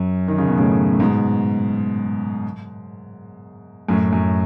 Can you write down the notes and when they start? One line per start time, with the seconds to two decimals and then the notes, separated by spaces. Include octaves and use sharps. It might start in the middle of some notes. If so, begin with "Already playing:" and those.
Already playing: F#2
0.28 D#3
0.38 C#3
0.48 B2
0.58 A2 C#3
0.93 A2
1.00 G#2 B2
3.89 F#2 A2
4.13 F#2